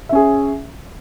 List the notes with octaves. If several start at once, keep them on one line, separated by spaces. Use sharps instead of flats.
C#4 G#4 E5